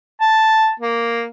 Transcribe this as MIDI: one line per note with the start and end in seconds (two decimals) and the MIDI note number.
0.21 0.72 81
0.80 1.26 58